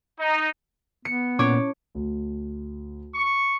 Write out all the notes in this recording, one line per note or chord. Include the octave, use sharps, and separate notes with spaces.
D#4
B3 C#7
A#2 C#4 C#5 D6
D2
C#6